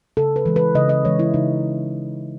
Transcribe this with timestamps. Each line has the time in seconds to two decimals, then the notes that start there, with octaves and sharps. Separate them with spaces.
0.17 C#3 A4
0.36 B4
0.46 E3 G#3
0.56 B4
0.75 C#3 D#5
0.89 D#5
1.05 E3 G#3 C#5
1.19 E4
1.34 C#3 D#4